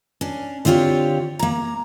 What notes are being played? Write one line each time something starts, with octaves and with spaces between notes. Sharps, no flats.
C#4 D4
D3 C4 F4 G4 C#5
A#3 A#5